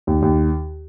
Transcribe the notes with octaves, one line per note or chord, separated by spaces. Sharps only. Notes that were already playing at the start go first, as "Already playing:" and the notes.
D#2
D#2